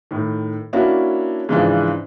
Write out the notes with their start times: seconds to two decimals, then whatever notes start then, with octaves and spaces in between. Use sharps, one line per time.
0.11 A2 D#3
0.73 A#3 C#4 D4 E4 F#4
1.49 G#2 C#3 E3 F3 D4